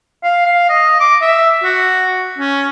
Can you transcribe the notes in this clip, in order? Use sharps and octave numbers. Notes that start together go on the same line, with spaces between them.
F5
F5
D#5
D6
E5
F#4
C#4